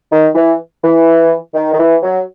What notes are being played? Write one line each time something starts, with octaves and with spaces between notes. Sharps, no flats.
D#3
E3
E3
D#3
D#3
E3
F#3